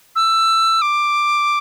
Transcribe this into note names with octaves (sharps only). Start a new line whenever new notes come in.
E6
D6